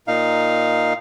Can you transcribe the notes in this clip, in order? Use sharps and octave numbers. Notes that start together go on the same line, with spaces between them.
A#2 D#4 F5